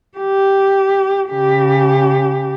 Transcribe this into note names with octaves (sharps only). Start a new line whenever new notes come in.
G4
C#3 G4